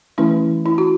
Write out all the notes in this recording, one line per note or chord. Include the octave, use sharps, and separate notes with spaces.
E3 A3 C#4 E4
E4
F#4